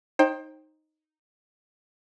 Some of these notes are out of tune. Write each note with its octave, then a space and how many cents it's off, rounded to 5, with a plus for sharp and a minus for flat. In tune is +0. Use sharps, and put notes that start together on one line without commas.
D#4 +0 C5 +30 G5 +0